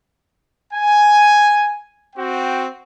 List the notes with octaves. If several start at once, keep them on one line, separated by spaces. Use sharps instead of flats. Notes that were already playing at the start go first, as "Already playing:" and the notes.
G#5
C4 F#4 G5